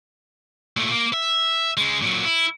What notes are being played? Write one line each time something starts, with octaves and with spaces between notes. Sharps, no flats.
A#2 A3
A#3
E5
C#3 G#3
A#2 F#3
E4